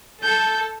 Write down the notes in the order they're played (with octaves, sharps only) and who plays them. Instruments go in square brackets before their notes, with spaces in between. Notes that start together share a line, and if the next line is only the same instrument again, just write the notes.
[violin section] A4 [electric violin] G6